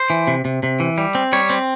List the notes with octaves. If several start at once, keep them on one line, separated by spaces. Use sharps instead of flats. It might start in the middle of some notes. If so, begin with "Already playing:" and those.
Already playing: C5
E3
C3
C3
C3
E3
G3
C4
G3 C#5
C4